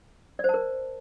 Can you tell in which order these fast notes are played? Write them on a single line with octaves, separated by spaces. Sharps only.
D5 C5 A5 A#4